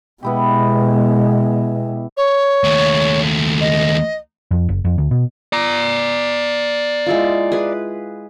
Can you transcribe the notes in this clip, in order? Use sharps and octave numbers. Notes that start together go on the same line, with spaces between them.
B2 G#3 B3 E4 G4
C#5
D#2 A3
D#5
F2
F#1
F2
D2
B2
D5 A#5
G#3 E4 F4
G#4 B4